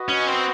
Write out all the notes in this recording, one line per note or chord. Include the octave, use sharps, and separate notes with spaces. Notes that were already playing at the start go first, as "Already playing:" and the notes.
Already playing: F#4 B4 D#5
C#4
C4